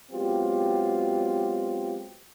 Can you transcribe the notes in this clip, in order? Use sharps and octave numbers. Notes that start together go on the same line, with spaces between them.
F#3 G#3 B3 C4 F4 G4